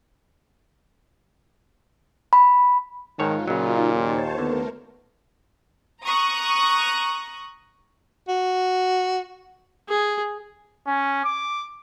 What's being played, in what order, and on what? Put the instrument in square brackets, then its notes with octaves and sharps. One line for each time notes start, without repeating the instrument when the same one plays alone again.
[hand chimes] B5
[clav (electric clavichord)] G#2 C#5 A5 [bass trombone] D#3 [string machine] D#4 F4
[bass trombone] A#2 [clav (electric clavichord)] C#3 F#3
[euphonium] D#2 [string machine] C5 C#5 A5
[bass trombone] D#2 [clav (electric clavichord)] D3 [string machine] A3 A#4 [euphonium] B3
[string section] A#5 C#6 D#6 F#6
[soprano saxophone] F#4
[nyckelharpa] G#4
[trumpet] C#4
D6